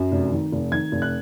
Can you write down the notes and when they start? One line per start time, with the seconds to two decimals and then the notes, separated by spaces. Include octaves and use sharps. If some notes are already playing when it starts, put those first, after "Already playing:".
Already playing: F#2
0.12 F1
0.32 D#3
0.52 F1
0.72 D#3 G#6
0.92 F1
1.02 F#6